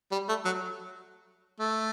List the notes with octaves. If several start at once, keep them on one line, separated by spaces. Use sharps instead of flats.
G3
A3
F#3
A3